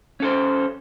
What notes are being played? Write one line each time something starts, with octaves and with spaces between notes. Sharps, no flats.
C#4 A4 C5